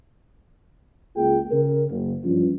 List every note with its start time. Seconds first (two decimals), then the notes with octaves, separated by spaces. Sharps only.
1.17 C#2 A#3 F4 G#4 G5
1.52 C#3 A#4
1.91 F#1
2.24 G2 E3 F3 C#4 F4